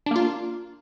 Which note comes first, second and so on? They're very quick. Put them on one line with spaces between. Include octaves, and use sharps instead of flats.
D4 A#3 F4